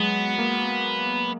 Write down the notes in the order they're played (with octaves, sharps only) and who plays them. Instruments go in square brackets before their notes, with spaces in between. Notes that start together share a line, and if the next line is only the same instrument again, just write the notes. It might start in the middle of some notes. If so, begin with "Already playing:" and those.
Already playing: [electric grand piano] F#3 G#3 [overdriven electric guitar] B3
[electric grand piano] A#3